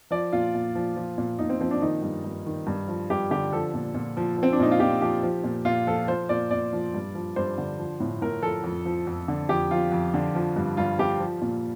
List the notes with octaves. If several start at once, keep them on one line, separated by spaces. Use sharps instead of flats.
F3 D5
A#2 F4
A#2
F3
F3
A#2
A#2 D#4
C4
F3 C4
D4
D#3 D#4
G2
G2
D#3
G2
F3
G2 G4
D3 G4
F3 A4
A#2
A#2
F3
F3
C4
D4
A#2 D#4
F4
A#2 G4
F3 G4
F3
A#2
A#2 F4
F3 A4
F3 C5
A#2 D5
A#2 D5
F3
G2
F3
G2 C5
D3
F3
A2
A2 A#4
F3 A4
F2
F3
F2
D3
F2 G4
F3 F4
F2
D3
F3
G2
G2 F4
F3 G4
F3
A#2